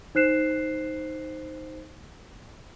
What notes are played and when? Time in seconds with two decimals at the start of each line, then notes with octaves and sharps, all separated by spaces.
0.15 D#4 C5 F#6 C7 E7